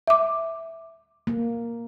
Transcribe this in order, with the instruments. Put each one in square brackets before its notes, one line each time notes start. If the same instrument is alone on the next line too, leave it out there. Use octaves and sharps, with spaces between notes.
[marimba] E5 D6
[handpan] A#3